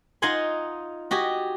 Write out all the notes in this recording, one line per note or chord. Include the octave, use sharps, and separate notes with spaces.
D#4 F4 D#5 F#5 G#5 C6
F#4 G4 D#5 G#5